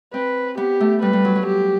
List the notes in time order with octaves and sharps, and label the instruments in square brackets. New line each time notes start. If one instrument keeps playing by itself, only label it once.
[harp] C4 [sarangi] B4
[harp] B3 [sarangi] G4
[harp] A3
[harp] G3 [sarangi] B4
[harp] G3
F#3
F#3
[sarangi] G4